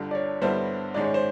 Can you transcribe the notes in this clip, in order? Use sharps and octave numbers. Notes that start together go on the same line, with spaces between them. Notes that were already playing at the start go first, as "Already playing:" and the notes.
Already playing: G1 G2 D3
D5
C#5
G2 D3 G3 B3 E4 C5
G#2 D#3 G#3 C#4 D5
C#5
C5